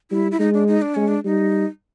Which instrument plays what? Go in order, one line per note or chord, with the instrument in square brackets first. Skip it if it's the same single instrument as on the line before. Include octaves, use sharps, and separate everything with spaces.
[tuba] G3 [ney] E4
[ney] E4
[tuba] G#3 [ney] D#4
[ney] D4
D#4
D4
[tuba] G#3 [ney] C#4
[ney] D4
[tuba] G3 [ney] D#4